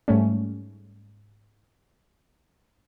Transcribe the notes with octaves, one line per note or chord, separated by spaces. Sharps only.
G#2 G3 A3 C#4